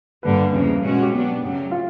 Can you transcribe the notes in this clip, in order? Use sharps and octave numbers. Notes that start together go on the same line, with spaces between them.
G2 D3 G3 A#3 B4
E2 C#3 F3 A#3
B2 G#3 C#4 F#4
G4
F#3 B3 D4
F#2 C#3 F#3 A3
F4